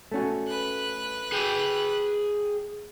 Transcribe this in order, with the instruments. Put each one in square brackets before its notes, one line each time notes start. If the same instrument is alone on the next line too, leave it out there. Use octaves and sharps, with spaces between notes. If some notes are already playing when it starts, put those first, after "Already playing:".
[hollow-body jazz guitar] A3 C#4 F#4
[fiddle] B4 F#6
[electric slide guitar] G#4 G5